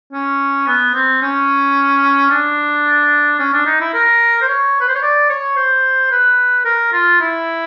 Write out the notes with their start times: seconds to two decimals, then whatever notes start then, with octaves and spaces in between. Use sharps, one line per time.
0.13 C#4
0.67 B3
0.95 C4
1.22 C#4
2.31 D4
3.39 C#4
3.53 D4
3.66 D#4
3.81 E4
3.94 A#4
4.41 C5
4.48 C#5
4.81 B4
4.88 C5
4.96 C#5
5.03 D5
5.30 C#5
5.57 C5
6.11 B4
6.65 A#4
6.93 F4
7.21 E4